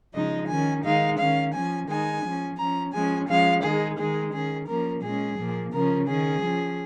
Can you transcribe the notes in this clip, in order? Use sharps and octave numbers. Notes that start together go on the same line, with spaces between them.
C#3 F3 G#3 D#4 D#5
D#3 C#4 G#5
D#3 G#3 D#4 F5
D#3 C#4 F5
F3 C#4 G#5
D#3 G#3 D#4 G#5
F3 C#4
F3 C#4 A#5
F3 G#3 C#4 G#5
F3 G#3 C#4 F5
D#3 G#3 D#4 G#4
D#3 G#3 D#4 G#4
D#3 C#4 G#4
F3 A#3 C#4 A#4
A#2 G#3 C#4 G#4
A#2 F3 A#3
C#3 F3 C#4 A#4
D#3 C#4 G#4
F3 C#4